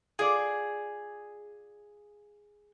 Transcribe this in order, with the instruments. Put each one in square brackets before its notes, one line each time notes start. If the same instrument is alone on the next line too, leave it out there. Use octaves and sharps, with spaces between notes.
[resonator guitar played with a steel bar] F4 D5 [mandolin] G#4